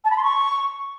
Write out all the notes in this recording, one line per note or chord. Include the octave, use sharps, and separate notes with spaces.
A5
B5
C6
C#6